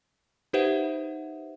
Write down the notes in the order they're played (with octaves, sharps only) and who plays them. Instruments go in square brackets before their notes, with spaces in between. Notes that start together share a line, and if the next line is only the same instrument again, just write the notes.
[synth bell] D#4 G4 B4 C5 E5 F#5